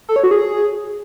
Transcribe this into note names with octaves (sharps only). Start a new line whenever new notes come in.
A4
C#5
F#4
G#4